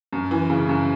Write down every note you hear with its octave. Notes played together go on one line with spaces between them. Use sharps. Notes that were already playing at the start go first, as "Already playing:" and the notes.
F#2
E3
C#3
F#2